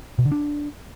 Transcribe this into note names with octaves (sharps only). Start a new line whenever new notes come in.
B2
D3
D4